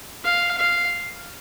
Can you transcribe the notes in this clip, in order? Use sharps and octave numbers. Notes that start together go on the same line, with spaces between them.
F5
F5